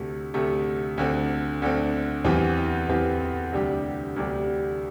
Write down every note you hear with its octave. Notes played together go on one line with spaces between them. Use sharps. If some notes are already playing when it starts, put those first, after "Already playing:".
Already playing: D2 C3 A3
D2 C3 A3
D2 D3 C4
D2 D3 C4
E2 E3 C4 G4
E2 E3 C4 G4
D2 C3 G3 D4 G4
D2 C3 G3 D4 G4